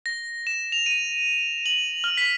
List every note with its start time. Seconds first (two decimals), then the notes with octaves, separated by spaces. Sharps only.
0.06 A#6
0.47 E7
0.72 F7
0.86 D#7
1.66 F#7
2.04 F6
2.17 B6